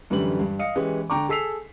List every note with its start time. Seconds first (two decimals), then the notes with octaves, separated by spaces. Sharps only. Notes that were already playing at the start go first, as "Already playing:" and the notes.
0.10 F#2 D3 E3 G3 F#7
0.39 G2
0.59 D#5 F5 D#6 C#7
0.75 E3 G#3 C#4 G4
1.10 D3 G5 A#5 C#6 D6
1.29 G#4 A4 E6 B6 C7 F7